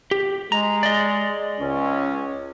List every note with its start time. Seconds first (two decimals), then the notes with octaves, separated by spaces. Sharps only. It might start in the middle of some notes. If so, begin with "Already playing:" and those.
0.11 G4
0.52 G#3 A#5
0.83 D5 D#5
1.61 C#2 C#4